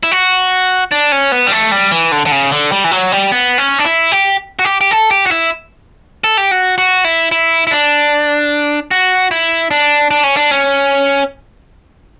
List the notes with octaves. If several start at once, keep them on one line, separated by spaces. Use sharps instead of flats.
E4
F#4
D4
C#4
B3
G3
A3
G3
E3
D3
D3
C#3
D3
G3
E3
F#3
G3
B3
C#4
D4
E4
G4
F#4
G4
G4
A4
G4
F#4
E4
A4
G4
F#4
F#4
E4
E4
E4
D4
F#4
E4
D4
D4
C#4
D4
C#4